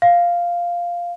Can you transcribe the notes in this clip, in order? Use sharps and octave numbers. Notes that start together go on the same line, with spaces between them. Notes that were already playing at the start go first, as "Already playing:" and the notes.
F5